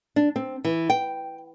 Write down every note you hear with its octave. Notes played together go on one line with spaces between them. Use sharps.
D4
C4
E3
G5